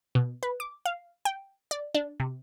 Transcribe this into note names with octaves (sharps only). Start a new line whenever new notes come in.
B2
B4
D6
F5
G5
D5
D4
C3